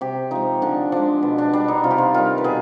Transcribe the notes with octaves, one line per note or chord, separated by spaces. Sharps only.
C3 G4
F3 G#3 D#4
D3 D4
F3 G#3 D4
B2
D4
G3 D4
D#4
C3 F4
G4
F4
D#3 G3 F4
B4
B2 G#4